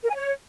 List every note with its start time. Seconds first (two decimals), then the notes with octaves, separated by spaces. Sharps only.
0.03 A#4
0.09 G#5
0.15 C#5